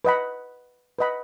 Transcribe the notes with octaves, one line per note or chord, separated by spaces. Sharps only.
B4 D#5 F#5 B5
B4 D#5 F#5 B5